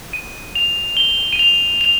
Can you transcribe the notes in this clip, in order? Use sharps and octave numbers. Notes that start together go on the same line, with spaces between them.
D#7
F7
G7
D#7
F7
F7